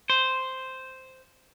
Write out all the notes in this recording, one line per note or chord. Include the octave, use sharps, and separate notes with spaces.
C5